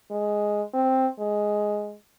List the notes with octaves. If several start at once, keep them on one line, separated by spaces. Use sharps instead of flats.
G#3
C4
G#3